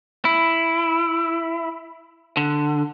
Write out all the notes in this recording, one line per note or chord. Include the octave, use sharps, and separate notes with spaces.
E4
D3